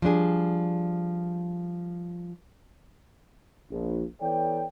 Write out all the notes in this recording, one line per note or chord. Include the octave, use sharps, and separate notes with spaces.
F3 G3 D4 G#4
A#1
E3 B3 A4 C#5 D5 G5